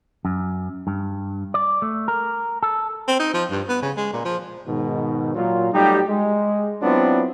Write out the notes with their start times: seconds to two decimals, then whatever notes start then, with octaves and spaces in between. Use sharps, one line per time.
0.25 F#2
0.87 G2
1.54 D5
1.82 A3
2.08 A#4
2.63 A4
3.08 C4
3.20 D#4
3.34 F3
3.50 G2
3.69 B3
3.83 C#3
3.97 G#3
4.13 A#2
4.25 F3
4.67 G#2 B2 D#3
5.35 A#2 F#3 F4
5.73 F#3 G3 A3 D#4 G4
6.09 G#3
6.82 F#3 B3 C4 D4 E4 F4